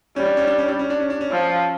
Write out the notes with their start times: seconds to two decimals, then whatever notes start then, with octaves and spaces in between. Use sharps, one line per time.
0.16 G3 C#4
0.27 D4
0.37 C#4
0.47 D4
0.58 C#4
0.68 D4
0.79 C#4
0.90 D4
1.00 C#4
1.10 D4
1.21 C#4
1.32 F3